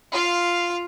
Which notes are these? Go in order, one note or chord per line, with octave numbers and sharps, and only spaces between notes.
F4 F5